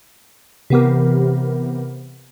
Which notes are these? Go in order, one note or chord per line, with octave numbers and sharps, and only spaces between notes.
C3 E3 B3 G4 A#4